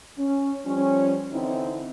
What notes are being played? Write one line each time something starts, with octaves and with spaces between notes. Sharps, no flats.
C#4
F3 G3 C#4
D3 E3 C4 D#4 E4